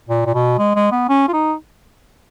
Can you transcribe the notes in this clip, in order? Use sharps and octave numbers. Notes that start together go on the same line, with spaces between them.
A#2
A#2
B2
G#3
G#3
B3
C#4
F4
D#4